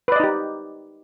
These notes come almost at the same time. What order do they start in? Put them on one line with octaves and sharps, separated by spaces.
B4 D5 D#5 D#4 G4